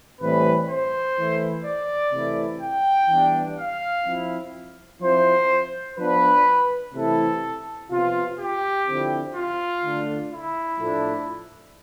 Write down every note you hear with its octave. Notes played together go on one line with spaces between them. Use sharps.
A2 E3 G3 C4 B4
C5
E3 A3 E4
D5
C3 E3 A3 E4
G5
E3 G3 B3 D4
F5
F3 C4 E4
F3 C4 E4 C5
F3 B3 D4 B4
C3 E3 A3 E4 A4
C3 F3 B3 F4
G4
D3 F3 C4 E4
F4
D3 A3 D4
E4
A2 F3 A3 D4